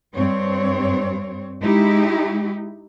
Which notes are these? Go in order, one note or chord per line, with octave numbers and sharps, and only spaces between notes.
G2 C4 C#5
G#3 D#4 E4 G4